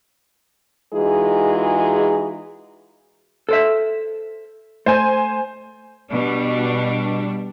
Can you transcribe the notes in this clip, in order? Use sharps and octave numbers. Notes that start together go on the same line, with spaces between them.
E3 G#3 D#4 F4 F#4 G#4
A4 C5 E5
A3 C5 G#5
B2 G3 D4